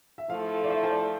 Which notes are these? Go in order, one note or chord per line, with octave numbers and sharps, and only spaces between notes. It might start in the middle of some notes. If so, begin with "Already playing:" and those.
E5
F3 A3 E4 A4 F5
D5
E5
C5
D5